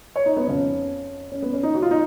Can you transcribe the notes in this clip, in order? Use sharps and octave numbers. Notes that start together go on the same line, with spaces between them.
C#5
D#4
B3
F2 C#3 F3 C#4
C#4
B3
C#4
D#4
F#4
F4
D#4